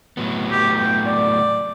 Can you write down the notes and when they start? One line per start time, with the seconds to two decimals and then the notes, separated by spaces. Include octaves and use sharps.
0.17 A2 F#3 B3
0.51 G4
0.78 G5
1.06 D5